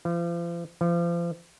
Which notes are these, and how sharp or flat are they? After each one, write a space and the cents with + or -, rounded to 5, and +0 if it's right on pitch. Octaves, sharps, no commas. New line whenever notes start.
F3 -40
F3 -35